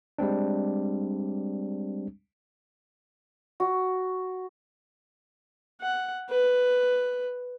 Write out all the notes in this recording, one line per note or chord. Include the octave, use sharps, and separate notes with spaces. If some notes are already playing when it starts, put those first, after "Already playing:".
G3 G#3 C4 D4
F#4
F#5
B4